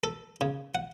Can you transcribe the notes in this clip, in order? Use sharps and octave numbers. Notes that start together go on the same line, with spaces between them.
A4
C#3
F#5